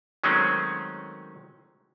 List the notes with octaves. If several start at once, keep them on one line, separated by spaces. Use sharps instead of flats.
D#3 F#3 G#3 A3 C4 C#4